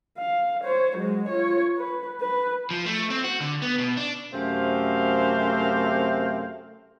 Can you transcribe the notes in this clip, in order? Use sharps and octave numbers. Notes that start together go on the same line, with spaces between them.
F5
C5 C#5
F#3 G#3
F4 C#5
B4
B4
F3
A3
C4
F#4
D3
B3
B2
D4
F#2 C3 A3 C4 C5 F5